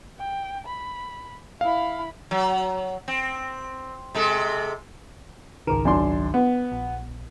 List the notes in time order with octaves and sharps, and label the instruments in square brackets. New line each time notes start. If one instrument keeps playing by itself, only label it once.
[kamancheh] G5
B5
[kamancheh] E4 B5 [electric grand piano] F5
[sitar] F#3
C4
C3 G#3 A4
[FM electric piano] G#1 C#2 D#3 [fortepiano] A#4
[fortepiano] F#2 D4 C6
B3
[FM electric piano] A#1